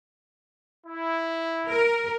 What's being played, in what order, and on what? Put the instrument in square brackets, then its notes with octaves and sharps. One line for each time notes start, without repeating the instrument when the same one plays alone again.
[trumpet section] E4
[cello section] A#4